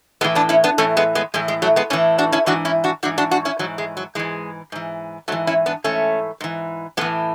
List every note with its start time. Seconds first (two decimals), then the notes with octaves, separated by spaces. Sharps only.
0.21 A2 G#3 B3
0.24 E3
0.35 B3 D4
0.49 C#4 E4
0.64 B3 D4
0.78 A2 E3 A3 C#4
0.97 G#3 B3
1.15 G#3 B3
1.34 A2 E3 G#3
1.48 G#3
1.62 F#3 A3
1.76 G#3 B3
1.90 A2 A3 C#4
1.93 E3
2.18 D4 F#4
2.32 C#4 E4
2.46 G#2 E3 D4 F#4
2.65 C#4 E4
2.84 D4 F#4
3.03 G#2 E3 D4 F#4
3.18 D4 F#4
3.31 D4 F#4
3.45 C#4 E4
3.59 G#2 E3 F#3
3.78 G#3
3.97 F#3
4.15 G#2 E3 G#3
4.72 G#2 E3
5.28 G#2 E3 F#3 A3
5.47 C#4 E4
5.66 B3 D4
5.84 G#2 E3 A3 C#4
6.40 G#2 E3
6.97 A2 G#3 B3
7.01 E3